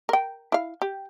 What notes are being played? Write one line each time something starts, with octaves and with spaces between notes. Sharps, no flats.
A#4 G5
E4 F5
G4